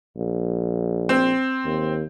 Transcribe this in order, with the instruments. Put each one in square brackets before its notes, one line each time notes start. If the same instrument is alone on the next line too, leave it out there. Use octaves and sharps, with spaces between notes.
[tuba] A#1
[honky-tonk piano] C4
[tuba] D#2